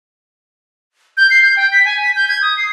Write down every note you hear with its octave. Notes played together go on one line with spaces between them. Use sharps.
G6
C7
G6
G5
B6
G#5
B6
G6
G#6
D#6
C7